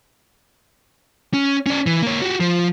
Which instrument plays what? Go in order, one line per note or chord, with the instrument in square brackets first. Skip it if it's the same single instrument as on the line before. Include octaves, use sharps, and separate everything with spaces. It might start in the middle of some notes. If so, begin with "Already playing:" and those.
[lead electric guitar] C#4
C#4 D5
E3
A#3 C#5
F#4 G4
F3